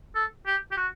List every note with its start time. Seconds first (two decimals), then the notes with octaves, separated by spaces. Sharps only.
0.15 A4
0.47 G4
0.71 G4
0.77 F#4